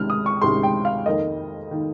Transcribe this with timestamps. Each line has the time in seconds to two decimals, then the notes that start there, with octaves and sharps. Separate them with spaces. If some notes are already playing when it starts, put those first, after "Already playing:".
Already playing: C#2 C3 D#3 G#3 F6
0.10 D#6
0.26 C#6
0.41 C#2 C3 D#3 G#3 C6
0.63 G5
0.85 F5
1.06 F2 D#3 A#3 D#5
1.71 D#3 A#3